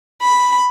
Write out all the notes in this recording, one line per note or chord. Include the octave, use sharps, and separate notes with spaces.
B5